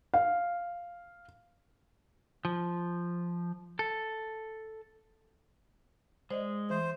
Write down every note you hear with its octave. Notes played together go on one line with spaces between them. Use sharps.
F5
F3
A4
G#3 C5 D5 D#5
E3 C5